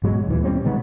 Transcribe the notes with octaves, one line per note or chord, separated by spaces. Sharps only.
G#2 B2 F#3 G#3
D#2 A#2 E3
B2 G3 C4 C#4
B2 D#3 G#3 B3